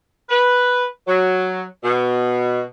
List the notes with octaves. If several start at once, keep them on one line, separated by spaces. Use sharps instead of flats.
B4
F#3
B2